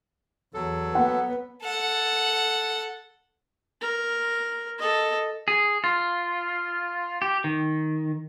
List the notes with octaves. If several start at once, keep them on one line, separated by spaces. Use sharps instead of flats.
E2 F#3 A4
B3 F#5
A4 F#5
A#4
A4 D#5
G#4
F4
G4
D#3